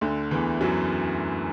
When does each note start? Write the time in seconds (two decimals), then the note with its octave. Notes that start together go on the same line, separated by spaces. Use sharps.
0.01 D2 D3
0.31 E2 E3
0.61 F#2 F#3